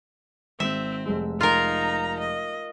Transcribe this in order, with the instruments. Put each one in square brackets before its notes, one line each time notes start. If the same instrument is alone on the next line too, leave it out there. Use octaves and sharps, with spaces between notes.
[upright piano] G#1 [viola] C4 [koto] E5
[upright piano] F1 G#3
[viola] D#4 A#5 [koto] F4 A#4
[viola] D#5